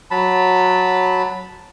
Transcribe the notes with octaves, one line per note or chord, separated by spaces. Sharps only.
F#3 A5 B5